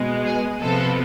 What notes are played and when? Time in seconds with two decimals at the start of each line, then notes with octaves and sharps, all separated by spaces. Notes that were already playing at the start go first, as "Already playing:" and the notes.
Already playing: B2 G#3 B3
0.24 G#4
0.61 C3 F3 B3 A4